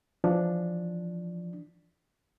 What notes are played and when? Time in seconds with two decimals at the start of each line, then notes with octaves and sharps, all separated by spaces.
0.24 E3 F3 D4